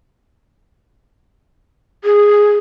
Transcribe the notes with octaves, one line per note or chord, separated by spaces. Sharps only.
G#4